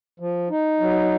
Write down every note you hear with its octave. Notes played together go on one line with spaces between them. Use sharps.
F3
D#4
F#3